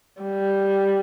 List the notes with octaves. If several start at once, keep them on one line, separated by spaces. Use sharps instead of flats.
G3